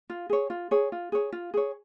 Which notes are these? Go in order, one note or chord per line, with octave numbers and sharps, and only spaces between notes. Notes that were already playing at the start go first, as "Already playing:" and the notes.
F4
G#4 C#5
F4
G#4 C#5
F4
G#4 C#5
F4
G#4 C#5